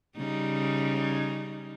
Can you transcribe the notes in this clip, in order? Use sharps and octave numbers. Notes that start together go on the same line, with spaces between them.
C#3 G3 D#4